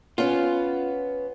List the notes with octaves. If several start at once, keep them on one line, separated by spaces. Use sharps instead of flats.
B3 C#4 F4